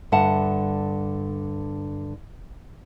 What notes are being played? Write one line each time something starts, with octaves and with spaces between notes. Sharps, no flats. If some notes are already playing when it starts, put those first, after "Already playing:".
G2 D3 E5 F#5 A5